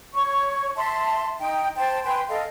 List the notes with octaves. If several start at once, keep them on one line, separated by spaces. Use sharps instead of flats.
C#5 C#6
E5 A5 C6
D#4 G5
C5 G5 A5
B4 G5 G#5 C6
A4 D#5 F5